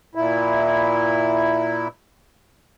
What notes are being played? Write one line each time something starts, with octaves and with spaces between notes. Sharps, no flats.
A#2 E4